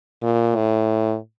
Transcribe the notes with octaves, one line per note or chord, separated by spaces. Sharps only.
A#2
A2